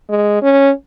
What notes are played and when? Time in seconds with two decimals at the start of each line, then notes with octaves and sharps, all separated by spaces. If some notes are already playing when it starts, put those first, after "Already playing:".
0.09 G#3
0.42 C#4